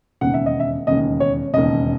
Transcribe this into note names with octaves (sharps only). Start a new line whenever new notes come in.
E1 D#2 C#3 F#5
E5
D#5
E5
E1 D#2 C#3 D#5
C#5
E1 D#2 C#3 D#5